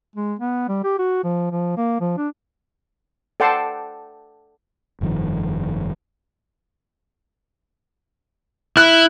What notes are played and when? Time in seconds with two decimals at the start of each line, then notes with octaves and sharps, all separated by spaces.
0.16 G#3
0.39 B3
0.68 G3
0.84 G4
0.99 F#4
1.24 F3
1.51 F3
1.77 A#3
2.00 F3
2.17 D4
3.40 A4 D5 F#5 G5 A5 C6
5.01 F1 G2 D#3 F3
8.77 E4 F#6